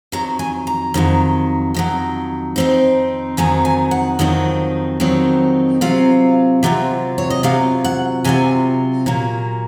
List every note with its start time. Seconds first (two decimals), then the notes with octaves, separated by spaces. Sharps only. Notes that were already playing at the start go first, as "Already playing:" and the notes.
0.12 F2 D#3 F#3 A#5
0.39 G#5
0.67 A#5
0.94 F2 D#3 F#3
1.74 F2 D#3 F#3
2.56 F2 D#3 F#3 C4 D#4
3.37 F2 D#3 F#3 C4 D#4 G#5
3.65 G#5
3.91 F#5
4.19 F2 D#3 F#3 C4 D#4
5.00 F2 D#3 F#3 C4 D#4
5.81 C3 F#3 C4 F4 F5
6.63 C3 F#3 C4 F4
7.18 C#5
7.30 D#5
7.43 C3 F#3 C4 F4 F5
7.84 F#5
8.24 C3 F#3 C4 F4 G#5
9.06 A#2 F#3 A#3